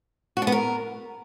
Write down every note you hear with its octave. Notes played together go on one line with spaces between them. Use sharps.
F#4
D4
B3
A#4